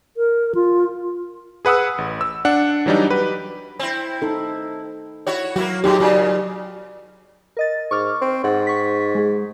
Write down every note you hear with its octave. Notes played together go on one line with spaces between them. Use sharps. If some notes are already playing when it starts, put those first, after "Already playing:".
A#4
F4
G#4 B4 F#5 D#6 E6
A1
E6
D4 F#5
E3 F#3 G3 D4 D#4
G4 B4
C4 E4
D#4 A4
E4 F#4 C#5
F#3 A#3 E4 F#4
A2 F#3 G#3 D#4 G4
A#2 C#3 F#3
A#4 D#5 A6
G#2 C#6 D6 F6
C4 C#6
G#2 F#5
C#6 B6
G#3 G#4